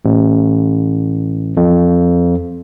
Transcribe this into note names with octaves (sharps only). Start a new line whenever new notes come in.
A1
F2